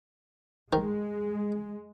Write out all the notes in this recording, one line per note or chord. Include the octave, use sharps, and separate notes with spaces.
D#3 G#3